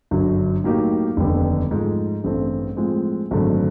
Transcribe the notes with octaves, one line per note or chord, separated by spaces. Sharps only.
G1 F#2 D3 F#3
A2 F#3 A#3 D#4 G4
F1 D#2 D3 G3 B3
G#2 F3 A3
A1 G2 E3 A3 C4
A2 F3 G#3 C4
G#1 F#2 D3 F#3 A3